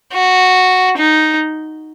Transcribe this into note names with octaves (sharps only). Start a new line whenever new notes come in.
F#4
D#4